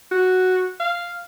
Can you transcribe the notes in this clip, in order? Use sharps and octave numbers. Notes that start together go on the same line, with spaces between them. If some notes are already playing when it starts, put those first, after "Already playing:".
F#4
F5